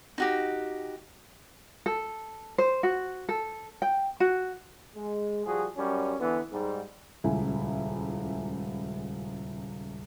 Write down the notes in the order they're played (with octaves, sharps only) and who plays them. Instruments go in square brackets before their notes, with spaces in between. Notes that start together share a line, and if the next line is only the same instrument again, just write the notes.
[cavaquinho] D#4 F#4 G4
[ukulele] A4
C5
F#4
A4
G5
F#4
[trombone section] G#3
F3 G3 F#4 G#4
F#2 G3 C#4
D3 E3 B3
G#2 G3
[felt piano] D#1 C#2 E4 G#5